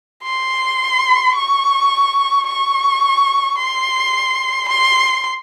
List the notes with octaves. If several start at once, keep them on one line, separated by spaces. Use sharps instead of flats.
C6
C#6
C#6
C6
C6